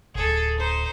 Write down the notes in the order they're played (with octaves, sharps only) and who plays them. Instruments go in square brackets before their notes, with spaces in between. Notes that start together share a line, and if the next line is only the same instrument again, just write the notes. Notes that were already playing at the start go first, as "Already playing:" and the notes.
[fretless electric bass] D1 G#1 [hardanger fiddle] G#4 A4
[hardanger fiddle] D#4 C5